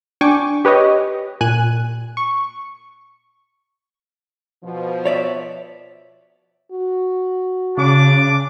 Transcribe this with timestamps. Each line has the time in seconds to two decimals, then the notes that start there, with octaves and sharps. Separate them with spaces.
0.21 D4 G5 G#5 C#6 D6
0.65 G4 B4 C#5 D#5
1.41 A#2 G#5 F#6 D#7
2.17 C#6
4.63 B2 F3
5.06 C#5 D5 E5
6.72 F#4
7.77 C#3 D4 D6